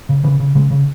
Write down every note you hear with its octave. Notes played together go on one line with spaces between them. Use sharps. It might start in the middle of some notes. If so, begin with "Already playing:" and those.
C#3
C#3 E3
C#3
C#3 G#3
C#3